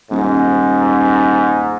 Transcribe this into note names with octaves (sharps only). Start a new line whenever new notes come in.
D#1 G#2